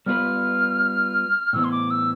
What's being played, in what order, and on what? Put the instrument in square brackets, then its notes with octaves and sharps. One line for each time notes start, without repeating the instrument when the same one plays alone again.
[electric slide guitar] G3 B3 F4 B4 [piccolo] F6
[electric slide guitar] A2 E3 B3 [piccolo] E6
[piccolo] C6
D6
E6